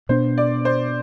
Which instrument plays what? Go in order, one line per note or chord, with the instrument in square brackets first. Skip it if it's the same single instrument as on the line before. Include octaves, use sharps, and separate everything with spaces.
[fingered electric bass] B2 B3 D4 [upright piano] C5
[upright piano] D5
C5